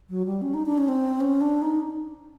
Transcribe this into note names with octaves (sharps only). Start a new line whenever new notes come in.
F#3
G3
C#4
D#4
D4
C#4
C4
C#4
D4
D#4